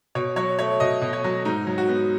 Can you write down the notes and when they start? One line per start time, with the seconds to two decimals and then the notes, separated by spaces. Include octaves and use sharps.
0.15 B2 C#5
0.36 F#3 C#5
0.59 A3 C#5
0.80 B2 D#5
1.01 B2
1.13 C#5
1.24 F#3
1.45 G#2 D#4
1.67 F#3
1.78 F#4
1.89 B3